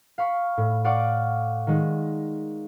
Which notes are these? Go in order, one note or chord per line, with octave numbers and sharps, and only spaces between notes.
F5 B5 C#6
A2
D5 F5 F#5 C#6 D6
D#3 G#3